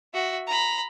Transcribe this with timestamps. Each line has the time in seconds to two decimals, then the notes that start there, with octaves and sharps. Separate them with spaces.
0.14 F#4 E5
0.47 A#5 B5